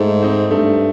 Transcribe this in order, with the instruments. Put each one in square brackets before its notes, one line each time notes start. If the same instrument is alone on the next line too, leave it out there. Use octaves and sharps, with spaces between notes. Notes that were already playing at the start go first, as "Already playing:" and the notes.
Already playing: [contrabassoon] G#2 [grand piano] A3
[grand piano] C4 D#4
[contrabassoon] G2 [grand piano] A3